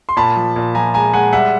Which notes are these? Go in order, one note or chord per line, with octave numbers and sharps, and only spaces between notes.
C6
A#2 A5 B5
F3
A#2
F3 G#5 A#5
G#3 G#5 A#5
G#3 F#5 G#5
G3 E5 F#5